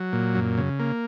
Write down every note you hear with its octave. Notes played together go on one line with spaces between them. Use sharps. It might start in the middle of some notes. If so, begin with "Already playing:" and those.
Already playing: F#3
A#2
F#2
C#3
A#3